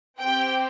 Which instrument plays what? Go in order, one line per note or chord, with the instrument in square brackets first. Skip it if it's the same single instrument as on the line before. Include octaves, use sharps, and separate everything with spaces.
[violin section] C4 G4 G5